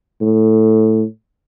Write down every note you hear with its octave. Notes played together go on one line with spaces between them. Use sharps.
A2